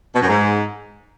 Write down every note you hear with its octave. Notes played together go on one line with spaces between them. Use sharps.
B2
F#2
G#2